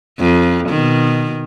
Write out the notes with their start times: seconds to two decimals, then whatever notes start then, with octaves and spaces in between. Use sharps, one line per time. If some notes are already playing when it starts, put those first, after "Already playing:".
0.19 F2
0.69 B2 D#3